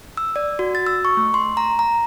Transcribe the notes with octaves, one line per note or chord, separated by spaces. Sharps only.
E6
D5
F#4
A6
E6
C#6
A3
C6
A#5
A#5